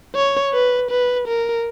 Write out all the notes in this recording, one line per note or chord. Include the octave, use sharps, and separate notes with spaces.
C#5
B4
B4
A#4